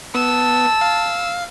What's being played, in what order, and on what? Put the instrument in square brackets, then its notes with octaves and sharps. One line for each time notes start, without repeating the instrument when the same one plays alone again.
[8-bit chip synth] B3 [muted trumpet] A5 [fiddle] E6
[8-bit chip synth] F5